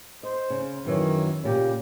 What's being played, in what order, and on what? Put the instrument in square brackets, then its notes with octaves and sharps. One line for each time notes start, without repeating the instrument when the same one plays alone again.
[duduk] C5 [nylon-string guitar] D#5
[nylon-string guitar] C#3
[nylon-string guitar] F#2 E3 F#3 [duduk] D#3
[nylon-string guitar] A#2 C#3 [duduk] G4